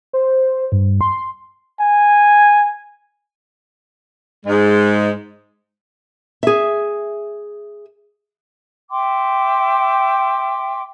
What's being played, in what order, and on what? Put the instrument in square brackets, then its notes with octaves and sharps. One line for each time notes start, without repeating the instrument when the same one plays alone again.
[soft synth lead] C5
G2
C6
[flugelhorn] G#5
[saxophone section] G#2 G#3
[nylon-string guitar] G#4 E5
[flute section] E5 G5 C6 D6